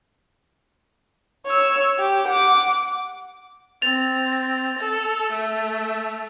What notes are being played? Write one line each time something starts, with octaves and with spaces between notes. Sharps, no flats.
C#5 E6
G4
F#5 D6
C4 A6 F7
A4
A3